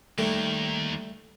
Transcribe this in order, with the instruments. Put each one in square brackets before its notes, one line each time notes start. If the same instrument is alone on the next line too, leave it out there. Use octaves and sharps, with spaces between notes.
[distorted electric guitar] D#2 D#3 [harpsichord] G3 A3